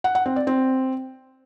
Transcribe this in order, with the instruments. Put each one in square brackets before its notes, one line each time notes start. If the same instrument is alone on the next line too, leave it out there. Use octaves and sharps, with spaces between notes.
[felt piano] F#5
F#5
C4
D5
C4